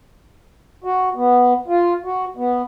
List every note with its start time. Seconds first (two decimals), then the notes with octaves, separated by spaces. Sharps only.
0.84 F#4
1.15 B3
1.68 F4
2.05 F#4
2.37 B3